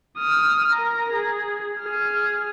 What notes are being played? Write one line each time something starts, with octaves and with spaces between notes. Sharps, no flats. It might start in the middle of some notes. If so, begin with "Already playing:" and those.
D#6 F6
A#4 A#5
G#4
G#4 F6